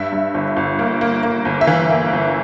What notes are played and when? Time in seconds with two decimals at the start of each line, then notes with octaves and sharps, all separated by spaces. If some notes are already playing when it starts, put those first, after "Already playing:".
Already playing: G2 E5
0.12 G2
0.34 G1
0.57 G1
0.79 A#3
1.01 A#3
1.23 A#3
1.45 G1
1.61 E5
1.67 E3 F5
1.90 A#3
2.13 G1